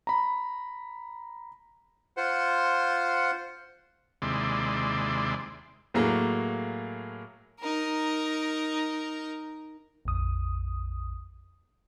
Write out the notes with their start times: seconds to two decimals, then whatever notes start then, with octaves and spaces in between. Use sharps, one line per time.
0.07 A#5 B5
2.17 F4 C5 F#5
4.22 D#2 C3 G#3 E4 D5 C6
5.94 A2 F#3 A#3 G#4 A#5
7.61 D#4 A#4
10.05 A#1 F2 D#6